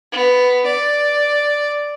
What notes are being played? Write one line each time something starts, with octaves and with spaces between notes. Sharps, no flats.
B3
D5